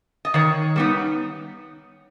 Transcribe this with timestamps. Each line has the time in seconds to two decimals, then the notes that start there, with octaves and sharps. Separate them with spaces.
0.25 D#5
0.34 D#3 C#5
0.76 G3 B3 D#4